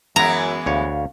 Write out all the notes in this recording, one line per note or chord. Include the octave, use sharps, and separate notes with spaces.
F#2 E3 G#3 B3 A#5
D2 C#5 F5